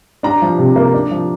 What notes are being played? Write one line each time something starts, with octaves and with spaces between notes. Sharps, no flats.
D4 A#5
F3
C3
A#3
D4
F3